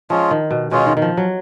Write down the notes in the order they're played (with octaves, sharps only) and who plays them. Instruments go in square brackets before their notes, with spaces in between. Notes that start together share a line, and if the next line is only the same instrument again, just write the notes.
[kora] F3 [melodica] G#3 C#4 F4
[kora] D#3
B2
[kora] B2 [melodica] G#3 C#4 F4
[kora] D#3
D#3
F3
F#3